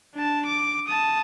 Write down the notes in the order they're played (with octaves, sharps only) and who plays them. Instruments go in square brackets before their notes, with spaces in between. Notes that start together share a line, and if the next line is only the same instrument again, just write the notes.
[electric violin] D4 A5
D6
A5 D#6